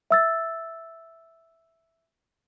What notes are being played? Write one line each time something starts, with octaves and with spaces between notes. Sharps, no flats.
E5 E6 A6